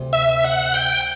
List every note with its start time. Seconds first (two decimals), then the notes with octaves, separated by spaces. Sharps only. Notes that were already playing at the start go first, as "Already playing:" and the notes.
Already playing: D2 C3
0.13 E5
0.44 F#5
0.74 G5